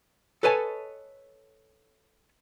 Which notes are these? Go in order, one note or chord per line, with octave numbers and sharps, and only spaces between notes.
A4 B4 C#5 D#5 G#5 A5